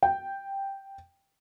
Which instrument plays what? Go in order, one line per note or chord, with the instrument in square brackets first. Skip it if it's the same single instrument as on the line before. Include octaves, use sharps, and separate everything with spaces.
[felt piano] G5